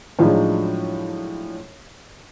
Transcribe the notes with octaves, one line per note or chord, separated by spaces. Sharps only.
A2 F3 F#3 G#3 D4 D#4